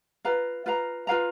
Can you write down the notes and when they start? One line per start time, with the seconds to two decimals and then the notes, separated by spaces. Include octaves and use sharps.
0.25 F4 B4 F5 A#5
0.66 F4 B4 F5 A#5
1.07 F4 B4 F5 A#5